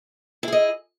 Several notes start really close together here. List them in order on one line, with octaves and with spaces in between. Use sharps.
E4 G#4 D#5